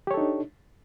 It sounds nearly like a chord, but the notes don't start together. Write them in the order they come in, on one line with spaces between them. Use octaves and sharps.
G4 C#5 A4 D#4 D4